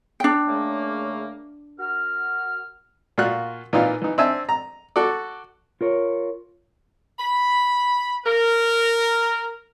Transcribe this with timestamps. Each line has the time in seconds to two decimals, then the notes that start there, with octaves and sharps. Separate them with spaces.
0.20 D4 G5
0.47 C#3 A3 A#3
1.79 F#4 A#4 F6
3.18 A#2 F4 F#4 F#6
3.73 A#2 E3 D#4 F4
4.02 E3 D#4
4.18 C4 D4 E5 G#5 A5
4.49 A#5
4.96 F#4 A4 D5
5.81 F4 A#4 C#5
7.19 B5
8.25 A#4